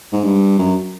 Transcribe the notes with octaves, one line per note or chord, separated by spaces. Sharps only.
G#2
G2
F#2